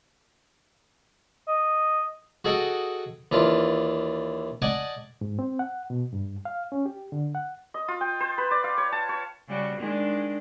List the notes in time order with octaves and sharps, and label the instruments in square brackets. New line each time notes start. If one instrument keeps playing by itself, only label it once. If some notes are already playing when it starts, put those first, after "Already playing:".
[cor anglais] D#5
[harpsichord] F#4 G#4 A4 D#5 F#5 G5
D#2 E3 D4 F4 A5
D5 D#5 F#5 G#5 A5
[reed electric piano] G#2
C4
F#5
B2
G2
F5
C#4
G4
D3
F#5
[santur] D#5
F4
G5
C5
B4
D5
F5
C#5
A5
C#5
[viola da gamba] C#3 G3 F#4
D#3 G#3 D4